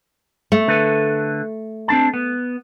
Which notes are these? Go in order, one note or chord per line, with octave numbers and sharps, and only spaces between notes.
A3
D3 A4 B4
C4 D4 A5
B3